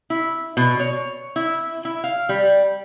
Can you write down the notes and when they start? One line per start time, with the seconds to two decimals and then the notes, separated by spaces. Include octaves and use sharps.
0.10 E4
0.57 B2
0.80 C#5
1.36 E4
1.85 E4
2.04 F5
2.29 G3